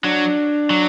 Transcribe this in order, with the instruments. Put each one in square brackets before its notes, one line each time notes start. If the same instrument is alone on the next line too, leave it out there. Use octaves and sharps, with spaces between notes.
[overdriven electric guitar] F#3 [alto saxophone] D4
[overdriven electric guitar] F#3